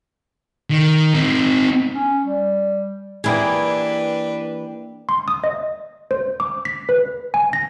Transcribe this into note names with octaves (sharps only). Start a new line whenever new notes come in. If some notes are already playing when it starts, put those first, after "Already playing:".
D#3
C4 D#4
C#4
G3
E3 A#3 D4 E4 G4 G#4 B4
C6
D#6
D#5
C5
D6
B6
B4
G#5
A#6